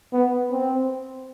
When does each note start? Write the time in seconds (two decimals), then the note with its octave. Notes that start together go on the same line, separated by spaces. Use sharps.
0.13 B3
0.52 C4